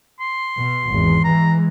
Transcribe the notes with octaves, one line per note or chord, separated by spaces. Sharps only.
C6
B2
G#1 E2
E3 G#3 A#5